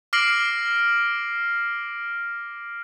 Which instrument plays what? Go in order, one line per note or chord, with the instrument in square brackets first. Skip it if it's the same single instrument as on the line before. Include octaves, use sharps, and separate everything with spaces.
[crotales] D6 F6 A#6 C7 D7 F#7